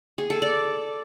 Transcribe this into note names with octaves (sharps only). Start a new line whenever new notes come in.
G#4
A4
D5